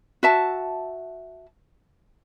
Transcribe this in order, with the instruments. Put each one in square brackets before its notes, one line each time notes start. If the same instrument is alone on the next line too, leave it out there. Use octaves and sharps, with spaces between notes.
[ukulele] F#4 E5 A5